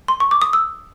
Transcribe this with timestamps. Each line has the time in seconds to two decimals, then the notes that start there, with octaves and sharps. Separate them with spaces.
0.08 C6
0.20 C#6
0.31 D6
0.42 D#6
0.53 E6